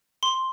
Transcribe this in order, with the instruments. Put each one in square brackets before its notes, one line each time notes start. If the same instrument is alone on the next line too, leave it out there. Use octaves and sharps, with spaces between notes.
[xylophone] C6